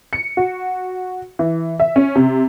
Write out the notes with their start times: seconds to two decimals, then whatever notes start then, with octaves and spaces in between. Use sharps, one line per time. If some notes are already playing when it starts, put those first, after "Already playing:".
0.13 C#7
0.37 F#4
1.39 E3
1.80 E5
1.96 C#4
2.15 C3